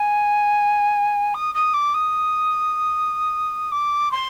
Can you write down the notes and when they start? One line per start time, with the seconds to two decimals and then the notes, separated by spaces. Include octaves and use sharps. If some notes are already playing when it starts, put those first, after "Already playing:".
Already playing: G#5
1.34 D#6
1.55 D#6
1.74 D6
1.94 D#6
3.72 D6
4.11 C6